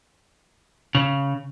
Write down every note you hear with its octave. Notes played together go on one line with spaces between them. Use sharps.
C#3